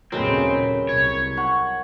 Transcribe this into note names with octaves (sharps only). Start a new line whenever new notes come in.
D#2 A#2 C#3 F#3 G#3 C4 A#4 B4
C2 C#5
F#5 C#6